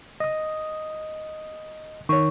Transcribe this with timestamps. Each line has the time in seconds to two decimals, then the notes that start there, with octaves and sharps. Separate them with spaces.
0.20 D#5 D#6
2.09 D#3 C#5 C#6